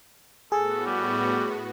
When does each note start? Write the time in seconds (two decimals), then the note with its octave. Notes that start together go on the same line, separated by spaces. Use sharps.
0.52 A2 B3 F#4 G#4 A4
0.86 G3